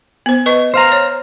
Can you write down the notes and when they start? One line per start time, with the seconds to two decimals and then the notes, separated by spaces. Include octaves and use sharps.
0.26 B3 C5
0.46 B4 D#5 C#6
0.74 C5 F5 A#5
0.92 C#5